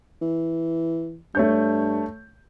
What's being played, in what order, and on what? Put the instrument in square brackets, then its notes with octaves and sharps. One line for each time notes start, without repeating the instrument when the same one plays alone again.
[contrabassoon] E3
[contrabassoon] G2 [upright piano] A3 C#5 G6